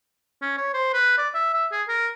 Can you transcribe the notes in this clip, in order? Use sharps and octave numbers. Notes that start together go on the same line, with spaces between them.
C#4
C#5
C5
B4
D5
E5
E5
G#4
A#4